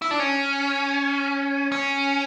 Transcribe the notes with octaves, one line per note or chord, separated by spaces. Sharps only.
E4
D4
C#4
C#4